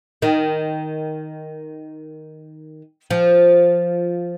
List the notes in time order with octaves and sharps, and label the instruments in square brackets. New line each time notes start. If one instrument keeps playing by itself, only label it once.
[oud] D#3
F3